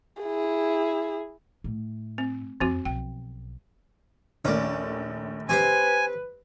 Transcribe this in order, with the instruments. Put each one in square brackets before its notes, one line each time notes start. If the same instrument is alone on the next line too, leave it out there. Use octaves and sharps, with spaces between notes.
[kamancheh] E4 G#4
[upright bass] A2
[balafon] C4
[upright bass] F2 [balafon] F3 C4 F#4
[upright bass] B1 [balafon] G5
[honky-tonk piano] A#1 D#2 A3 [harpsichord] C#4 A#4 D5
[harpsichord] C4 G4 C5 [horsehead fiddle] B4 [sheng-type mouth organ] G#5